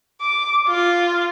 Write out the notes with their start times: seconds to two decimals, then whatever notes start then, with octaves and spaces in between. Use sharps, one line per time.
0.21 D6
0.68 F4